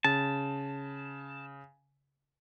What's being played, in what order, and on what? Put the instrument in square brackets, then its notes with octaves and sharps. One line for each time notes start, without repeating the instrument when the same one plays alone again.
[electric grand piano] C#3 [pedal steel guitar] A5